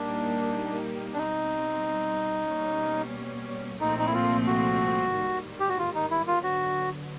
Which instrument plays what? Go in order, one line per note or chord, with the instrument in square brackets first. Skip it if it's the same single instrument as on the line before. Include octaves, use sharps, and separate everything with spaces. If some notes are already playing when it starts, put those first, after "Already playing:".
Already playing: [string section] A#2 G3 A#3 D#4 G4 [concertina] D4
[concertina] D4
[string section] B2 G3 C4 [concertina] D#4
[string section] B2 G3 A#3 C#4
[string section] C2 A#2 F3 A3 C4 [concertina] D#4
[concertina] D#4
E4
F4
F#4
[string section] G#2 D#3 G3 A#3
[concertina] G4
F#4
F4
D#4
E4
F4
[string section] D3 F#3 B3 [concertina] F#4